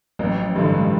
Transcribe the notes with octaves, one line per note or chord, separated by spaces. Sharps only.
A1 F#3
F3
G2 D3 E3
G#3